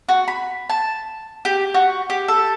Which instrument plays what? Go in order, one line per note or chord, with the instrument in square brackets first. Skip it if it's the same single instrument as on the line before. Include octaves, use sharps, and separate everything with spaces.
[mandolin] F#4
B5
A5
G4
F#4
G4
A4